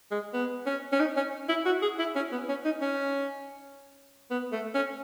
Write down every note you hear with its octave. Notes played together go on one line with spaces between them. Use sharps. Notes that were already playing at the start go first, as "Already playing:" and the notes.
G#3
B3
C#4
C#4
D#4
C#4
E4
F#4
G#4
E4
C#4
B3
C#4
D#4
C#4
B3
A3
C#4